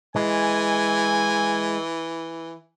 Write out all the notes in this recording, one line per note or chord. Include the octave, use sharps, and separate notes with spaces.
E3 G#3 G#5